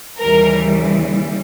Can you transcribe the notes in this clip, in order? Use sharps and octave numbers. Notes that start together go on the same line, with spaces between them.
D#2 C#3 E3 G3 A#4